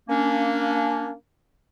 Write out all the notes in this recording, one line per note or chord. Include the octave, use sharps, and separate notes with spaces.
A#3 C#4 D4